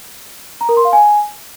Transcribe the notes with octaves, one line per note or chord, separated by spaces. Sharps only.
A#5
A#4
C6
F5
G#5